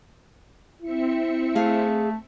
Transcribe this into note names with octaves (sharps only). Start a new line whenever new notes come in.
C4 E4 E5 C#7
A3 G#4 F5